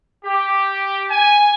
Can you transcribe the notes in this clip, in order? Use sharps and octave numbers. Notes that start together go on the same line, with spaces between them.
G4
G#5